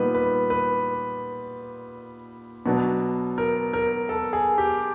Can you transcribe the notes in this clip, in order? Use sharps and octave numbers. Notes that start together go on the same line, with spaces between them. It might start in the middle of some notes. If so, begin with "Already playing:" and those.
Already playing: A#2 G3 B3 D#4 B4
B4
B4
B2 F#3 B3 D4
A#4
A#4
A4
G#4
G4